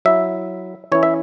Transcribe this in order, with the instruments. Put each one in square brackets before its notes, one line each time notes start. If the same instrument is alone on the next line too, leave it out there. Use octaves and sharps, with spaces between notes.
[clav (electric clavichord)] F#3 E4 E5
E3 C#4 E4 C#5
E5